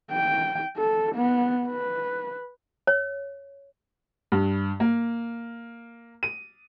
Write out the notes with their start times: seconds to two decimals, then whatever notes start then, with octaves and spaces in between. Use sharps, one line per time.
0.12 G5
0.77 A4
1.15 B3
1.67 B4
2.87 C#5
4.32 G2
4.80 A#3
6.23 D#7